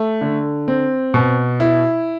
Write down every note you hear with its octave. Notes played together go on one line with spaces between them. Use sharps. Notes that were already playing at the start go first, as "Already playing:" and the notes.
Already playing: A3
D3
C4
B2
E4